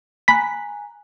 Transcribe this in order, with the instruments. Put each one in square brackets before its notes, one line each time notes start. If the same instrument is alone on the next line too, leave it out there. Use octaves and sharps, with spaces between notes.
[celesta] G#5 A#5 F#6 [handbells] B5 B6